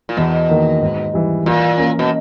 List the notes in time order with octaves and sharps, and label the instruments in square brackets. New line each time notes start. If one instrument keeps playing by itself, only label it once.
[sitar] A#2
[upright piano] E2 [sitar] B2
[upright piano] D#3 A#3
G#2
E3 G3
[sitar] A#2 [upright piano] E3
[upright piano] A#3 C#4
[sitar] B2